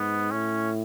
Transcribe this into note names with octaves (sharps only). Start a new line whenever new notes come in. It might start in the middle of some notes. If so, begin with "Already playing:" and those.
Already playing: G#2 B3
A2 C#4